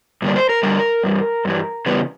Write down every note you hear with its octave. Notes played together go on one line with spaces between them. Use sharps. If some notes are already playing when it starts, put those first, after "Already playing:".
G2 D3 G3 A#3 D4
C5
A#4
G2 D3 G3 D4 A#4
G2 E3 G3
G2 E3 G3
C#3 E3 G3 B3